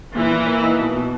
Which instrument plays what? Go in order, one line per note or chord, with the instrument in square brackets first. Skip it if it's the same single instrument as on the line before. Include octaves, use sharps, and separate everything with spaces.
[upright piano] A#2 [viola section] E3
[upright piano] A#2
A#3
D#4
B2
B2